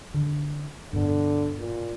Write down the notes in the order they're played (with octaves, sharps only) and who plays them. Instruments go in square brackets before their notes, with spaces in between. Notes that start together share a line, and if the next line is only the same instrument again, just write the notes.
[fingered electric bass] D3
[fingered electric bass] G2 B2 [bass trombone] D3
[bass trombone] A#2